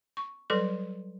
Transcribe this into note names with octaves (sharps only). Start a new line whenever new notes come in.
C#6
F#3 G3 A4 B4 C6